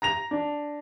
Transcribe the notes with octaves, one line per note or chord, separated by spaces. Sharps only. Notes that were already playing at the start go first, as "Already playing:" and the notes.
A#5 A#6 F7
D4